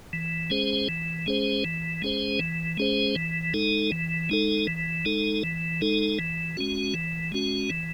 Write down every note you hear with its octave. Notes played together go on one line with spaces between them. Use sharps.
E3
G#3 C#4 G#4 C5
E3
G#3 C#4 G#4 C5
E3
G#3 C#4 G#4 C5
E3
G#3 C#4 G#4 C5
E3
G#3 D#4 A4
E3
G#3 D#4 A4
E3
G#3 D#4 A4
E3
G#3 D#4 A4
E3
G#3 C#4 F#4
E3
G#3 C#4 F#4
E3